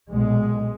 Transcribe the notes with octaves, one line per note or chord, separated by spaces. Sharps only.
B1 A#2 G#3